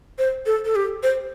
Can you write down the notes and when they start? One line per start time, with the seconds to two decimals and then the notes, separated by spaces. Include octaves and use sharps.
0.18 C5
0.46 A4
0.65 A4
0.76 G4
1.03 C5